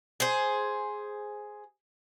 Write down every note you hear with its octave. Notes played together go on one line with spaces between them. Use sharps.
G#4 C5